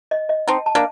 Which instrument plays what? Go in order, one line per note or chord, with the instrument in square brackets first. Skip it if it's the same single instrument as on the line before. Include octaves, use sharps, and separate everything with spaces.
[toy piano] D#5
D#5
[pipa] C4 D#4 [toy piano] A5
[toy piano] A5
[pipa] A#3 D4